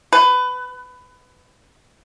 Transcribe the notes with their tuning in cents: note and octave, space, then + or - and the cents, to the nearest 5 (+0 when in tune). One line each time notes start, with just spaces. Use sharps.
B4 +20